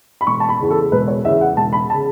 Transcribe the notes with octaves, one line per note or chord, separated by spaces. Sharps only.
B5
E1 C#6
A5
B5
E2 C#3
A4
E1 B4
C#5
E2 C#3 E5
F#5
E1 A5
B5
A5
C#3